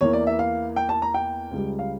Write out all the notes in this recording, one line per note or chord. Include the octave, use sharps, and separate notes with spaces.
E2 E3 A#3 E4 C#5
D5
E5
F5
G5
A5
A#5
G5
C#2 C#3 G3
F5